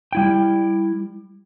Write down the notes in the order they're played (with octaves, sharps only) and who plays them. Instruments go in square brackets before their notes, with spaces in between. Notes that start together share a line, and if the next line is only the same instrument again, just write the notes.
[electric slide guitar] G3 E4 G5